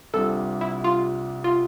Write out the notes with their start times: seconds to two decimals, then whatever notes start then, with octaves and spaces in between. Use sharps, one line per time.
0.14 C2 C3 G3 D4 F4 A4
0.61 E4
0.84 F4
1.44 F4